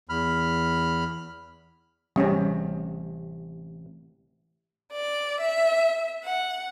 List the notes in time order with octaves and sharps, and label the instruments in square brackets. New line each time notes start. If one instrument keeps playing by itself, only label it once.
[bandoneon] E2 B5 F6
[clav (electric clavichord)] A1 C3 [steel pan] G3 C#4
[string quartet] D5
E5
F#5